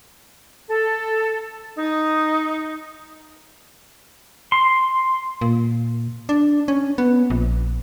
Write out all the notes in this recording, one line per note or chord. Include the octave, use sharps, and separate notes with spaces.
A4
D#4
C6
A#2
D4
C#4
B3
A#1